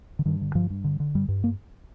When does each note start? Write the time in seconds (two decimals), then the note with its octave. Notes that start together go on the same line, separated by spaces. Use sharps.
0.19 D3
0.26 G2 D#3
0.41 D3
0.55 G2 F3
0.70 G2
0.84 D3
1.00 D3
1.15 G2 G3
1.28 G2
1.44 A#3